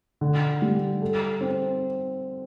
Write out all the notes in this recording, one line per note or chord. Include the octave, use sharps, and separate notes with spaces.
D3
G3
A4
C4